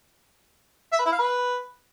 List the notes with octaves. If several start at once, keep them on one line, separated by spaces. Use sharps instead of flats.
E5
B4
E4
F5
B4